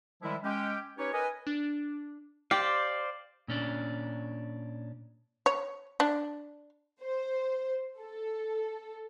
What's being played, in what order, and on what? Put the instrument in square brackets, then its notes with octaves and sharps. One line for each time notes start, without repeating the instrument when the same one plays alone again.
[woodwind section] D#3 F3 G3 G#3 E4
G#3 C#4 G4 G5
C#4 D#4 G4 B4 C#5
A#4 B4 D#5 G#5
[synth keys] D4
[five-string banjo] G4 [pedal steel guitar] C5 D5 F5
[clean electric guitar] A#2 C#4 D4
[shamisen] C#5
D4
[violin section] C5
A4